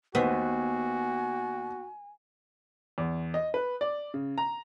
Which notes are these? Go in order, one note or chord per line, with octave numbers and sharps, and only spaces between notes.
D#2 B3 F#4 B4 C5 G#5
E2
D#5
B4
D5
C#3
A#5